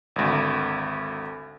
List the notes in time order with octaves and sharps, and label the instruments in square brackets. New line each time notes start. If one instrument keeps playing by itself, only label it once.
[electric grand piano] G#1 D2